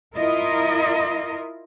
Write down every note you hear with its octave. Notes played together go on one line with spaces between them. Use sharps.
E4 F4 A#4 D#5